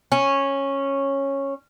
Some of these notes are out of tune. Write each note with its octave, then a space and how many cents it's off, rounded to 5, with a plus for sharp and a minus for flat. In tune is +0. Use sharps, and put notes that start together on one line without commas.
C#4 -10